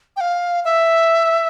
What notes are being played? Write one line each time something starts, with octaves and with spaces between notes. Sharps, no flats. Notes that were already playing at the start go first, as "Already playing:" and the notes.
G5
F5
E5